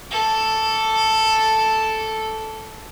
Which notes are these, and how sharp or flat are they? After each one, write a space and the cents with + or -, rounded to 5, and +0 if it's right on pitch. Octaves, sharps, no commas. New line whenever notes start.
A4 +0 D6 -40